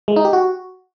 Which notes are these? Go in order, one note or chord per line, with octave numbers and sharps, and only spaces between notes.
G#3
D#4
G4
F#4